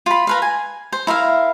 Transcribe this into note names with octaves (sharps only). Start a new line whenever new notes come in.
F4 B5
A#4 B4 F5
G#5
C5
E4 A#4 E5 F5